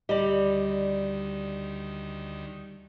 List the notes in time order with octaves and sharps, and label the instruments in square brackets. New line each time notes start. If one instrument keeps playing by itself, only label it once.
[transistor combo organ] D2 D#3 [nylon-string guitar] G3 [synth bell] D5 D#5